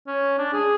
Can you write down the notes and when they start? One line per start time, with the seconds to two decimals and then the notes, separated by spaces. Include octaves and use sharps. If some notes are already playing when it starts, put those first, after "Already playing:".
0.07 C#4
0.38 D4
0.53 G#4